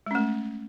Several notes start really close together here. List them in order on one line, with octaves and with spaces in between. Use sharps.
G#3 C#4 A3